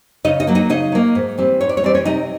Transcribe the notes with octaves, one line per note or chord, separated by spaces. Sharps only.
C#3 D#4 D#5
D#4 D#5
F#3 A#3
D#4 D#5
C#3 D#4 D#5
F#3 A#3
G#2
E3 G3 C4
G#2 C#5
D5
C#5
E3 G3 C4 D5
C#4 C#5
C3 D#4 D#5